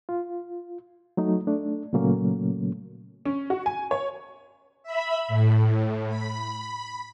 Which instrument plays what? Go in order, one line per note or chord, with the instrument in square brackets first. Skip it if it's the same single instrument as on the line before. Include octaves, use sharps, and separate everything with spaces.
[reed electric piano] F4
F#3 A3 D#4
A3 D4
A#2 C#3 F#3 A3 A#3 C#4
[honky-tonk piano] C#4
F#4
G#5
C#5
[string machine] E5 B5
A2
B5